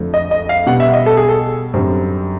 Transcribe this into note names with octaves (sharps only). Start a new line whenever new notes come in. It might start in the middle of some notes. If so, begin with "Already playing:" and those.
Already playing: F2 D3 F3 A3
D#5
D#5
F5
B2 G3 B3 F#5
E5
D#5
A4
G#4
A4
F#2 D3 G3 C4